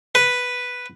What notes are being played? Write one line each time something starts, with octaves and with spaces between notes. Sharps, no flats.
B4